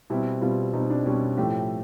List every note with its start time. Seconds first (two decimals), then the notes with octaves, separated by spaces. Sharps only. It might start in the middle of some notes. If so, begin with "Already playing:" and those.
0.10 B2 G3 C4 E4
0.41 B2 G3 C4 F4
0.73 B2 G3 C4 D#4
0.90 D4
1.06 B2 G3 C4 C#4
1.37 A2 F3 A3 G4